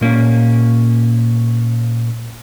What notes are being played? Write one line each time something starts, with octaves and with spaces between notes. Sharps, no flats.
A#2 A#3 C#4